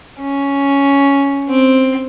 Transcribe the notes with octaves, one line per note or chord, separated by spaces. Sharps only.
C#4
C4